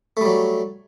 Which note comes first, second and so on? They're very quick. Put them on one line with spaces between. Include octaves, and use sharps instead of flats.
A3 G3 F#3